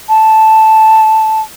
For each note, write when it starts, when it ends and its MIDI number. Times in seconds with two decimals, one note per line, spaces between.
0.09 1.41 81